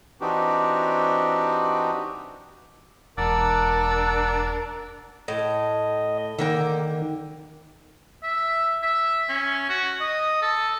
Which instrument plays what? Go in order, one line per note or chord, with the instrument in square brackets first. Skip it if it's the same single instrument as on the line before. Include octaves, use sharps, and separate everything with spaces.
[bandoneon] E3 C4 D4 D#4 F#4 G4
[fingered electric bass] E1 [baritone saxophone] D4 [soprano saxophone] A#4 [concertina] F#5 D6 E6
[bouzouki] A2 [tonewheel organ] D#5
[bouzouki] D3 A#3 G5 [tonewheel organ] D#3
[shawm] E5
E5
C#4
F#4
D#5
A4